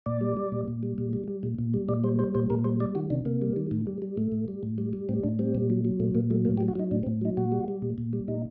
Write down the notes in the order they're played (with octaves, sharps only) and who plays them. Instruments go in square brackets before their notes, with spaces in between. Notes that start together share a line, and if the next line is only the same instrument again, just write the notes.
[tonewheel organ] A#2 D5
G3
G3
A#2
A#2
G3
A#2
G3
G3
A#2
A#2
G3
A#2 D5
G3 C5
G3 C5
A#2 C5
A#2 A#4
G3 C5
G3 D5
D#3 F#4
C3 D4
C3 A#3
G3
D#3
A2
G3
G3
A2 A3
A2
G3
A2
G3
G3
A2 C4
A2 D4
G3 C4
A#2
F#3
F#3
A#2 A3
A#2 A#3
F#3 A3
A2 A#3
G4
F#3
F#4
F#3 D#4
A2 D4
C4
A2
F#3 D#4
A#2 F#4
G3
G3
A#2
A#2
G3
A#2 D#4